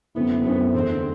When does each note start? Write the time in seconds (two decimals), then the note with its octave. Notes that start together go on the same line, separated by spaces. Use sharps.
0.15 F#2 D3 A3 B3 C4 E4
0.44 F#2 D3 A3 B3 C4 E4
0.74 E2 D3 A3 C4